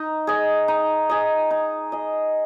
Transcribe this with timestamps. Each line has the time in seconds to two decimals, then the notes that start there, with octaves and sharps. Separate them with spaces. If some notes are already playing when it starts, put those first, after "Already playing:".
Already playing: D#4
0.27 G#4 D#5
0.68 D#4
1.09 G#4 D#5
1.51 D#4
1.92 G#4 D#5